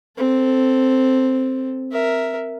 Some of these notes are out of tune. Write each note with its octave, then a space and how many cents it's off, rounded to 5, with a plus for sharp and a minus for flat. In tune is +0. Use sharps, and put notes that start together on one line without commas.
C4 +0 A4 +5
A#4 +0 E5 +0